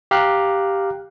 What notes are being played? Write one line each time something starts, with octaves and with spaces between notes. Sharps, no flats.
G4 F5 A#5 F6 F#6